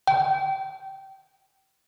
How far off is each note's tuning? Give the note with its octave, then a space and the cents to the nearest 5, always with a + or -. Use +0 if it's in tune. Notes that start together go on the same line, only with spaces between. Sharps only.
G5 -20